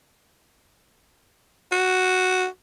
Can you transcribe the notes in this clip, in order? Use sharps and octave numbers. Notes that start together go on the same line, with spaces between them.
F#4